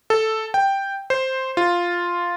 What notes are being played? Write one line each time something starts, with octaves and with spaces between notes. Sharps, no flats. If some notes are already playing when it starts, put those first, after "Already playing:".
A4
G5
C5
F4